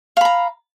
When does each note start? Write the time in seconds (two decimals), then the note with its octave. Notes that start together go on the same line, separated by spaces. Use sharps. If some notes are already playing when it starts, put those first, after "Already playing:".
0.17 F5
0.21 B5
0.25 A#5